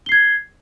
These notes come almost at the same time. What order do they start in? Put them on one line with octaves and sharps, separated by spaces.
G7 C7 G#6